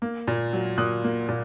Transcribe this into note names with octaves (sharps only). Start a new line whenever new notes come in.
A#3
A#2
F#3
A#2 D#6 F#6
A#3
A#2